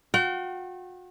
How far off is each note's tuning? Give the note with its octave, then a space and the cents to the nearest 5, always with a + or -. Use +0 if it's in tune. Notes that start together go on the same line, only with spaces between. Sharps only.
F#4 -40 G5 -40